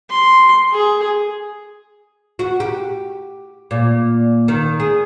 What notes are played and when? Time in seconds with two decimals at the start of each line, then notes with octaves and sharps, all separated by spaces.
0.10 C6
0.72 G#4
2.39 F#4
2.60 G4
3.71 A#2
4.48 D#3
4.80 G#4